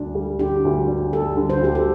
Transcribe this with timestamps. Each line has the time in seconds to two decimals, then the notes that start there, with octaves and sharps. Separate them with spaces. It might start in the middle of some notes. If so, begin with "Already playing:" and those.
Already playing: D2 D4
0.15 G3
0.39 D3 G4
0.65 D2
0.88 D4
1.13 G3 A4
1.37 D3
1.50 C5
1.61 D2 G4
1.75 A4